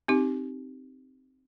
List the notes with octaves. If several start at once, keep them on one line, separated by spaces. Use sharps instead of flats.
C4 D#4 G4